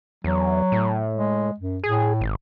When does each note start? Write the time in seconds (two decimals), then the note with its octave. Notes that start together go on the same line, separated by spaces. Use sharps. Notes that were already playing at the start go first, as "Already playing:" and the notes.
0.24 E2 F#3
0.72 A2
1.15 G#3
1.59 F#2
1.84 A2 G#4
2.21 G#1